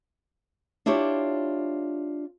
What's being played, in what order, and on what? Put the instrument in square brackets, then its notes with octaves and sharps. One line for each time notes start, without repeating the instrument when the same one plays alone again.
[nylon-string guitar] D4 E4 F4 G4 C#5